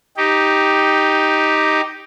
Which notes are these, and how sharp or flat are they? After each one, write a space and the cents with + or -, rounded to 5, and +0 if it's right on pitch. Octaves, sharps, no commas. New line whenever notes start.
D#4 +0 G4 +0